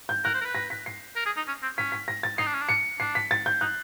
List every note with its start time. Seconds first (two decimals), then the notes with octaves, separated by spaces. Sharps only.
0.09 G6
0.24 A#4 F#6
0.34 C5
0.41 A#4
0.45 B4
0.55 A#6
0.70 B6
0.86 C7
1.16 A#4
1.26 G#4
1.36 D#4
1.47 C#4
1.62 C4
1.77 C#4 B6
1.92 B6
2.08 A#6
2.23 A6
2.38 D#4 C7
2.46 D4
2.54 C#4
2.62 D4
2.69 C#7
3.00 D4 C7
3.15 B6
3.31 A6
3.46 G6
3.61 D#4 F#6